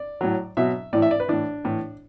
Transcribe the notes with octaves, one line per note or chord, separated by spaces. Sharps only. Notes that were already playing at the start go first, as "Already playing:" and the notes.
Already playing: D5
A2 F#3
B2 F#3 E5
A2 E3 D5
E5
D5
B4
A2 E3 D4
A2 E3